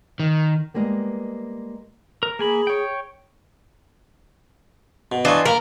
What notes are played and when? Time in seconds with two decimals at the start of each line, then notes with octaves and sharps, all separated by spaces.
0.20 D#3
0.74 G3 G#3 A#3 B3
2.23 A#4
2.39 A#3 G#4 G#5 B5
2.67 C#5 G5
5.12 B2
5.25 E3 D4 F4 D#5 C#6
5.45 A#3 A#4 A#5 B5